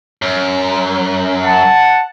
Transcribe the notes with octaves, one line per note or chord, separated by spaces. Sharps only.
F#2
F#5 A5